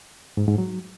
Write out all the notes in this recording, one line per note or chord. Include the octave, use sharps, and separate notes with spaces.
G#2
G#2
F#3